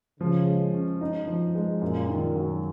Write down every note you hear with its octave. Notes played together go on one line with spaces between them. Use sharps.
C#3 F3
G#3
C#4
D#4
F3
G#3
F#2 A#2
D#3
F#3